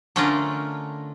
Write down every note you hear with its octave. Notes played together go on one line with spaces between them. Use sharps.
D3 A3 C#4 D4 F4 A#4